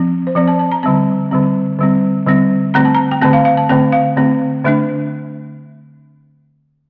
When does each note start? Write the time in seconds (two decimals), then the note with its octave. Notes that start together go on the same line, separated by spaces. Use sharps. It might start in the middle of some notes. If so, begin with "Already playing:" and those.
Already playing: F3 C4
0.27 C5
0.35 F3 C4 D5
0.48 A5
0.59 A5
0.72 A#5
0.83 D3 G3 C4 A5
1.31 D3 G3 C4
1.79 D3 G3 C4
2.26 D3 G3 C4
2.74 D3 A3 C4 A#5
2.85 A5
2.95 A#5
3.11 G5
3.22 D3 A3 C4 A5
3.33 F5
3.45 F5
3.57 A5
3.69 D3 A3 C4 G5
3.92 F5
4.17 D3 A3 C4
4.64 D3 A3 D4 E5